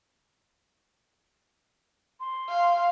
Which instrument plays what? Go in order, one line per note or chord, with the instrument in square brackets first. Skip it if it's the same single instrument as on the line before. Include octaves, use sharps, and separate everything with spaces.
[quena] C6
[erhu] F5